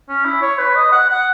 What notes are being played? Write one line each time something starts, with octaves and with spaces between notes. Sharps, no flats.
C#4
E4
C#5
B4
D#5
F#5
F#5